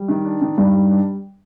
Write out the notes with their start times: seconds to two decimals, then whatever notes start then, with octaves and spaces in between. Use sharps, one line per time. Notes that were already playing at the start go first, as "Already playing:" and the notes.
Already playing: G3
0.08 D#3
0.25 D4
0.41 D#3
0.57 G2 D#3
0.74 G3
0.90 D4